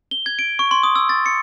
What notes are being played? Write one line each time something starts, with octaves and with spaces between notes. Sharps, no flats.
G7
G#6
D7
C#6
C6
D#6
E6
A6
C#7